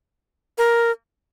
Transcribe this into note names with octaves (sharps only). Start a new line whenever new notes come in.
A#4